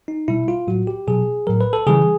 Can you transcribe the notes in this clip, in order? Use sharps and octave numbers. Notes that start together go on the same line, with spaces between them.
D#4
B2 G3 E4
F4
A2 F#3 F#4
G4
B2 F#3 G#4
A2 F#3 A#4
B4
A4
C#3 E3 G3 G#4